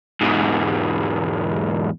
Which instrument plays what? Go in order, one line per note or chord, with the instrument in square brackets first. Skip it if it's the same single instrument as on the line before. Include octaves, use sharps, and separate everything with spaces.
[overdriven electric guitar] E2 G#2